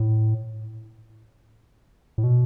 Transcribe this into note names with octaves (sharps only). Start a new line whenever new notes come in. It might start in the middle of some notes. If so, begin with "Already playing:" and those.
Already playing: A2
A2
B2